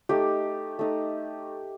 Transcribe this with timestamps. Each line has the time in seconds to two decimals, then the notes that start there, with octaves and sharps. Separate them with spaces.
0.09 A3 D#4 G4
0.79 A3 D#4